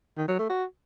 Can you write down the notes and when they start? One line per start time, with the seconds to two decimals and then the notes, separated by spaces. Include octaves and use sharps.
0.17 D#3
0.28 F#3
0.39 A3
0.50 F#4